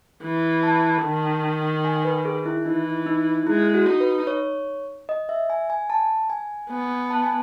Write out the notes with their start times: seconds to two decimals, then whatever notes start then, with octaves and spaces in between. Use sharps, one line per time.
0.23 E3
0.63 A5
1.03 D#3
1.85 G#5
2.05 B4
2.25 G#4
2.46 E4
2.65 E3 D#4
3.06 D#4
3.47 G#3 E4
3.74 F#4
3.86 D#4
4.00 B4
4.27 C#5
5.09 D#5
5.29 E5
5.50 G#5
5.70 G#5
5.90 A5
6.30 G#5
6.70 B3 G#5
7.10 A5
7.24 G#5